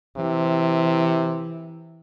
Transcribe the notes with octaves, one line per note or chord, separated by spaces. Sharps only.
C3 E3